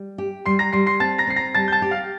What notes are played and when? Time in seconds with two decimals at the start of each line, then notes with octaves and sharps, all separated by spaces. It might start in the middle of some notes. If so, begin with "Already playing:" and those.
Already playing: G3
0.18 G4
0.46 G3 C6 C7
0.59 A#5 A#6
0.73 G3 C6 C7
0.86 C6 C7
1.00 C4 A5 A6
1.18 A#5 A#6
1.27 C4 C7
1.36 A#5 A#6
1.55 G3 A5 A6
1.68 G6
1.72 A5 A6
1.82 G4
1.91 F5 F6